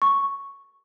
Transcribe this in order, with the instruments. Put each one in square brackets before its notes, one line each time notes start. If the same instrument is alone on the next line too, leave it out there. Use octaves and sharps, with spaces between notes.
[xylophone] C#6